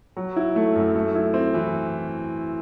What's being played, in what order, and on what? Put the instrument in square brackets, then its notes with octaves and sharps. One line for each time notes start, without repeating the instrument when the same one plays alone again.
[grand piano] F#3
E4
A3
F#2
A3
E4
C4
E3